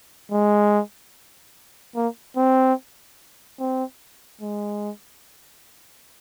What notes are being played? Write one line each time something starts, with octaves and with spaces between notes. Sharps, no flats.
G#3
A#3
C4
C4
G#3